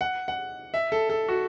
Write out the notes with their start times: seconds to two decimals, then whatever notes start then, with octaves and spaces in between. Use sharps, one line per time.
0.01 F#5
0.28 F#5
0.74 E5
0.92 A4
1.10 A4
1.28 F#4